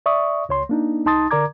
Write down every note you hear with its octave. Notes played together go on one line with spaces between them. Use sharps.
D5 E5 C#6 D#6
C#2 C#5 C6
A#3 D4 D#4
C2 D#4 A5 C6 D#6 A6
D3 A#4 D5 A#5 D6 G#6